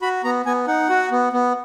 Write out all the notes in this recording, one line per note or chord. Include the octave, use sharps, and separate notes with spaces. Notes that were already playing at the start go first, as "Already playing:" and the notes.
F#4 B5
B3 A#5
B3 G#5
D#4 F#5
F#4
B3
B3